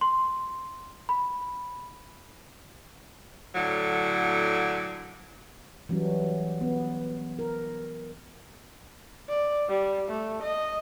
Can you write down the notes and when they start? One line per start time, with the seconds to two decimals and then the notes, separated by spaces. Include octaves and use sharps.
0.01 C6
1.09 B5
3.55 A2 D3 F#3
5.89 E3 F#3 G3 C#4
6.61 B3
7.39 A#4
9.28 D5
9.68 G3
10.09 A3
10.42 D#5